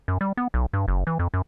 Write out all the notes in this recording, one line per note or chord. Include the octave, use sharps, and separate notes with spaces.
F#2
G3
B3
B1
G2
F#1
E3
F2
F#2